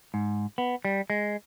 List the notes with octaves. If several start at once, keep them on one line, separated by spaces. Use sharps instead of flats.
G#2
B3
G3
G#3